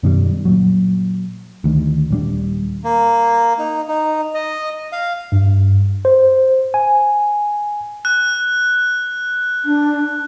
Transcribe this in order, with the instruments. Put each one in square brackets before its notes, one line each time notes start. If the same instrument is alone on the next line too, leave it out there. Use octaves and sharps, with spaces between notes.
[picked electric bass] F#2 B2 D#3 G3
A#2 F#3
D2 D#3
D#1 G3 D4
[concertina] A#3
D#4
D#4
D#5
F5
[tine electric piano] G2
C5
G#5
[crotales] F#6
[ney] D4